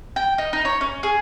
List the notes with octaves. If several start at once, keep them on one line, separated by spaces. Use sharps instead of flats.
G5
D#4
D#4
C#5
C#4
G#4